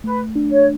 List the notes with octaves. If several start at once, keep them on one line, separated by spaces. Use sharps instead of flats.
A3 B4
D4
C#5